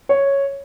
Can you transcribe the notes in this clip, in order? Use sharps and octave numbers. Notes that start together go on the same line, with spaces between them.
C#5